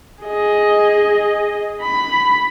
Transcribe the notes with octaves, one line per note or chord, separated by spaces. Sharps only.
G#4 D#5
B5